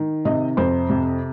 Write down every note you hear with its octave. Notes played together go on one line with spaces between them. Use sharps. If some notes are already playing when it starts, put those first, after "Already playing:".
Already playing: D#3
C3 D#5
F2 C5
C3